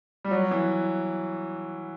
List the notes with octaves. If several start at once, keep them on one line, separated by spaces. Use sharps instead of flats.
G3
F#3
E3